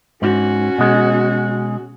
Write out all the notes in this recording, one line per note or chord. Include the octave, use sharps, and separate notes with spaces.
G#2 C#4 F#4
B2 G#3